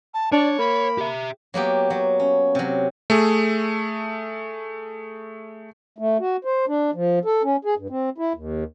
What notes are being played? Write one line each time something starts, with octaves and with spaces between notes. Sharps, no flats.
A5
D4 C#5 D5
A#3 B5
G4 E5
F#3 A#3 B3 G4
F#3
C#4
C3 F#3
A3 G#4
A3
F#4
C5
D4
F3
A4
C#4
G#4
G2
C4
E4
D#2